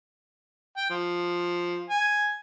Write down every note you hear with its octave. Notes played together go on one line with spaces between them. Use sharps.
G5
F3
G#5